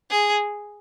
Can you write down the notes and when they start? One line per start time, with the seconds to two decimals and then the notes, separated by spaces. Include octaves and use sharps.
0.10 G#4